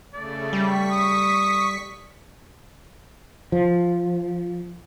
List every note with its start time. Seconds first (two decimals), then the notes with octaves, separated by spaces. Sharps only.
0.14 C#3 A3 D5
0.53 G3 C#6 B6
0.91 D#6
3.52 F3